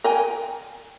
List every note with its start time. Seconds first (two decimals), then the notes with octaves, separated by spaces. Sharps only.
0.04 A#4 G5 G#5